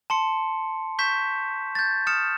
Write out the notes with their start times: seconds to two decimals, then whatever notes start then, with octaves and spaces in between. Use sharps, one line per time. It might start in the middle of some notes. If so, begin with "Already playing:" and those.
0.10 A5 C6 C#7
0.99 C#6 G6 B6 E7
1.75 G6 A6
2.07 D#6 F6 A6 C#7 E7